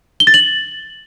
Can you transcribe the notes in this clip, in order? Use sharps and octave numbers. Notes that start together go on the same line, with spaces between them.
G7
A6
F#7